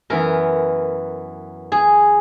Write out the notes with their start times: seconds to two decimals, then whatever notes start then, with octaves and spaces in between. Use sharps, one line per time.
0.10 F#2 E3 B3 A#4
1.72 G#4